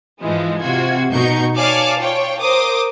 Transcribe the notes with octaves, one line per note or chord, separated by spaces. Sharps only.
G#2 E3 F3 G#3
C3 F4 F#4 G#6
B2 D#4 C#6 G6
C#5 D5 F5 G#5 A5 D6
F4 C#5 G5
A#4 C5 D6 D#6